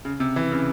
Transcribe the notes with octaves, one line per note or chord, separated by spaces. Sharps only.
C#3
C3
E3
C#3